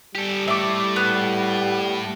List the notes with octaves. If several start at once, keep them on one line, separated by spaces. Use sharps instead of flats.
G3 G4 A4
A2 A3 E5 D6
B3